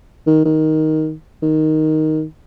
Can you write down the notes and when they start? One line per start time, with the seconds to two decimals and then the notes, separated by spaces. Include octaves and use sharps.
0.27 D#3
0.45 D#3
1.43 D#3